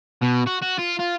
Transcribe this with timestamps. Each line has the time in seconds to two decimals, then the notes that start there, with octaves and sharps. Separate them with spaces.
0.22 B2
0.46 F#4
0.62 F#4
0.78 F4
0.99 F4